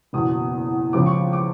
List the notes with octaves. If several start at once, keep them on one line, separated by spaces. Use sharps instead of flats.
F#1 E2 B2 D#6
C#2 C#3 F3 D6
C#6
D6